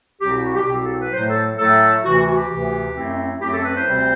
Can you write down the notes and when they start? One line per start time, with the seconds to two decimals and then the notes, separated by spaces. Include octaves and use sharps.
0.21 C2 B2 F#3 C4 G4
0.33 G4
0.44 F#4
0.55 G4
0.67 C2 B2 F#3 C4 G4
0.82 A4
0.97 B4
1.13 A2 F#3 A3 C5
1.28 A4
1.58 A2 F#3 A3 A4
2.04 D2 C3 E3 F#4
2.19 F#4
2.34 G4
2.50 D2 C3 E3
2.96 F#2 F#3 A3 C4 E4
3.41 F#2 F#3 A3 C4 E4 G4
3.52 A4
3.64 B4
3.75 C5
3.87 D2 C3 G3 C4